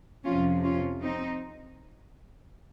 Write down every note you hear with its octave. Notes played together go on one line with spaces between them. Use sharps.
F2 C3 F3 C#4 F4
C#4 F4
C4 D#4